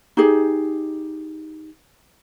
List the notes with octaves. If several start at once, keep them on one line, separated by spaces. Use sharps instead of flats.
D#4 G4 G#4